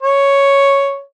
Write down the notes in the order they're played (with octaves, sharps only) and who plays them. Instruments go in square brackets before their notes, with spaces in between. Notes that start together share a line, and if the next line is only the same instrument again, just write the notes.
[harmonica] C#5